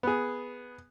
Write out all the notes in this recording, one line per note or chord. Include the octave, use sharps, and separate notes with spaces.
B3 G#4